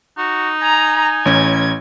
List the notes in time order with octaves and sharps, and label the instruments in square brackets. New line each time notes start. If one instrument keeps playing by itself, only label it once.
[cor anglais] D#4 [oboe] F#4
[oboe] G#5 [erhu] A#5
[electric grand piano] A1 C#4 [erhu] G#6